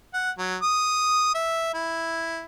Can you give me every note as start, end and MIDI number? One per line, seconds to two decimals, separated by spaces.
0.14 0.31 78
0.38 0.56 54
0.62 1.33 87
1.35 1.70 76
1.74 2.44 64